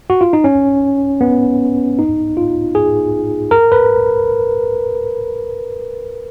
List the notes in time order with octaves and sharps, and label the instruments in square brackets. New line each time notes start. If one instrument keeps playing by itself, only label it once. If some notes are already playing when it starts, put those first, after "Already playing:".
[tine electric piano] F#4
F4
D#4
C#4
B3
D#4
F4
G#4
A#4
B4